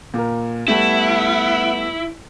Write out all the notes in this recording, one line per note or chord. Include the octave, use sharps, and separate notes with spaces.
A#2 A#4
G3 A3 B3 E4